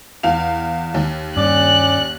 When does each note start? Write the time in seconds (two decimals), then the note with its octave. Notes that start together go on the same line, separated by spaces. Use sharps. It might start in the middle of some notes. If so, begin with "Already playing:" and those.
0.23 E2 F5 F7
0.94 D#2
1.37 G2 C#4 D5 F#6